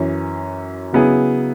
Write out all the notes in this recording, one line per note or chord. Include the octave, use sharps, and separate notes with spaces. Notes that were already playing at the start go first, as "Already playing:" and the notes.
Already playing: F#2 E3 C#4
C#3 F#3 B3 E4 G#4